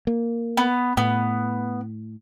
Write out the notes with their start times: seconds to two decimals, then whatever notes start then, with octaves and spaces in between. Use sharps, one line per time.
0.07 A#3
0.57 B3
0.97 A2 B3